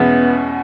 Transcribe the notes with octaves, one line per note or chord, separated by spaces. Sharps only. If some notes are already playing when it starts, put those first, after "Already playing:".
Already playing: E2 B2 G#3 B3 C#4 E4